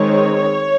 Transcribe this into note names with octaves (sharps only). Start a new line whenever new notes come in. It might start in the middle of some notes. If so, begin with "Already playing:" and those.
Already playing: D#3 G#3 C4 C#5